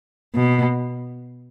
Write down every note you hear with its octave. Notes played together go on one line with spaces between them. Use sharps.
B2